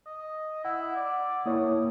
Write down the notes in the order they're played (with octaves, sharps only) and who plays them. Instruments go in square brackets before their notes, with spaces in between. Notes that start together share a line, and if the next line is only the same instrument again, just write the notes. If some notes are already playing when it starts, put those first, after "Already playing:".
[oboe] D#5
[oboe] E4 [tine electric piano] F#5
[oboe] D5
[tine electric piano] A#3 E4 C#5 [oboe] D#6